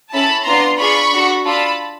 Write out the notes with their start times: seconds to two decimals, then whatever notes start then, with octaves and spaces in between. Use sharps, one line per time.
0.12 C#4 E4 A4 A5 B5
0.45 B3 D4 F4 A#5 C6
0.79 D4 F4 G#4 B5 C#6
1.12 D4 F#4 A4
1.45 D4 F4 A4 A5 B5